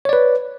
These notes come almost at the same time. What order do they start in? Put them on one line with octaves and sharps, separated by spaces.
C#5 D5 B4